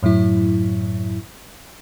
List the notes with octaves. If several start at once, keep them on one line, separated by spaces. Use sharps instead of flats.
F#2 A2 F#3 E4